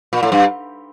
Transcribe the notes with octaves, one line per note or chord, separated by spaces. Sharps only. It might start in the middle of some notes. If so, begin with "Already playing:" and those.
A#2
A2
G2